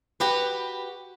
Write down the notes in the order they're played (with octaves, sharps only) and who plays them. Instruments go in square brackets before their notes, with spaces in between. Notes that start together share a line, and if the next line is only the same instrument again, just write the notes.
[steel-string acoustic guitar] F#4 G4 B4